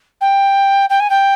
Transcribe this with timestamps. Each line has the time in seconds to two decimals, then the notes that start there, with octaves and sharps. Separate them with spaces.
0.21 G5
0.90 G5
1.00 G#5
1.10 G5